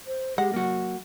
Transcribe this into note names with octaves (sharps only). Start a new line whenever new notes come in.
C5
G#3 G4 F#5
F#3 A#3 F#4